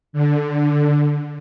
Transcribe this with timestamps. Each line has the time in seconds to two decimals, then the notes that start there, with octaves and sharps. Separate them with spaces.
0.13 D3